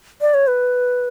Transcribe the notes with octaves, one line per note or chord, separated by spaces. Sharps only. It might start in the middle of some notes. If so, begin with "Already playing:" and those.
D5
C#5
B4